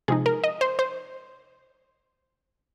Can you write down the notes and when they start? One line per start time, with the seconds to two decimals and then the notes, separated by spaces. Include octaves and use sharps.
0.08 C3 F3 G#3 D#4 G#4
0.26 A#4
0.44 D#5
0.61 C5
0.79 C5